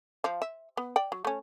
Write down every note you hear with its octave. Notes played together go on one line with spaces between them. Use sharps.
F3 F5
E5
B3
D5 G5
F#3
A3 C#4